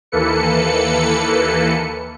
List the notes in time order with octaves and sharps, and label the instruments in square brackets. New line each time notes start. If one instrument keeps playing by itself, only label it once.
[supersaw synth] D#2 E3 A#3 A4 B4 C#7